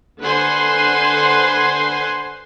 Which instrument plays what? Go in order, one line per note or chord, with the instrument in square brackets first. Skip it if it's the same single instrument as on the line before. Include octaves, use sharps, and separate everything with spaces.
[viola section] D3 B4 C5 F#5 G#5 C6